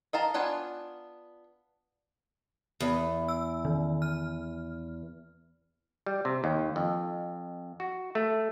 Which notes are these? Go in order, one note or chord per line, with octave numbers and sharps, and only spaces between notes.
D#5 F5 A5 A#5
B3 D4 F4 F#5 G#5
E2
E6
D#3
F6
G3
C3
D#2
F2
F#4
A3